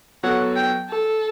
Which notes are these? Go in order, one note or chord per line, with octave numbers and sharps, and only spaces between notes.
F#3 B3 F#4 A4 C#5 F#5
G5
A4